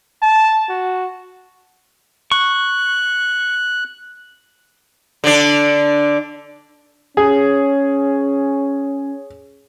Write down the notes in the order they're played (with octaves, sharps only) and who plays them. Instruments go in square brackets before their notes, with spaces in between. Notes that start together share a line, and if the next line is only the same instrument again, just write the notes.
[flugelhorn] A5
F#4
[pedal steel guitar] C#6 [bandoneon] F#6
[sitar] D3 D4
[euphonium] C#4 [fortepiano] G#4